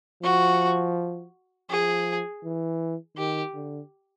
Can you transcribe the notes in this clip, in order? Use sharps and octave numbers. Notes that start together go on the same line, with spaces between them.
F3 F#4
F3 G#4
E3
D#3 G4
D3